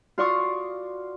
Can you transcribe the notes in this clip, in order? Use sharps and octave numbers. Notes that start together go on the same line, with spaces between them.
F4 F#4 D5 C6 C#6 D#6